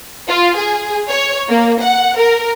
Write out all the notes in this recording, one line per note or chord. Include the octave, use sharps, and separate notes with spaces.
F4
G#4
C#5
A#3
F#5
A#4